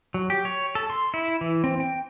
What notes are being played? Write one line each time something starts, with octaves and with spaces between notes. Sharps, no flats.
F#3
G4
C#5
A4
C6
E4
E3
C4
G5